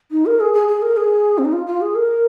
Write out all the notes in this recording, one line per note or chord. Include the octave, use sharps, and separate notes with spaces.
D#4
A#4
G#4
G#4
G#4
A#4
G#4
C4
D#4
F4
F4
G#4
A#4